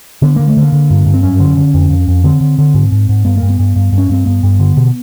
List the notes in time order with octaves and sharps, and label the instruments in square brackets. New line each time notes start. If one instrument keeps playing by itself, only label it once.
[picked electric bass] D3 B3
D3 A#3
A3
D3
A#3
D3
G2
G2
C4
F#2 C#4
D3
D3
F2
F2
F2
D3 C4
D3
D3
G#2
G#2
G#2
G2 B3
A#3
G2
B3
G2
G2
G2
C#4
G2 C4
G2 B3
G2
D3
B2